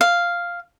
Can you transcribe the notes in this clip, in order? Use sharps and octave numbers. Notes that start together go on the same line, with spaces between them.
F5